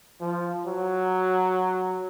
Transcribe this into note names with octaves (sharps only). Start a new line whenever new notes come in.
F3
F#3